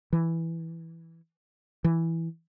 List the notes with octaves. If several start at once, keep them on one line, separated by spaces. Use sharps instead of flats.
E3
E3